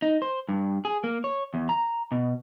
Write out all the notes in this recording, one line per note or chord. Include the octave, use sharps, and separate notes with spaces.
D#4
C5
G2
G#4
A#3
C#5
E2
A#5
B2